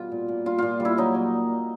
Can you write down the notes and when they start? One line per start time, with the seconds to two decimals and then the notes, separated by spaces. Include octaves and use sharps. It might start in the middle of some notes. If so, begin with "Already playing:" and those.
Already playing: B2 G3 F4
0.12 A#2
0.28 A#2
0.46 G3 F4
0.59 A#2 F4
0.80 G3
0.85 E4
0.97 F#3 D#4
1.15 F#3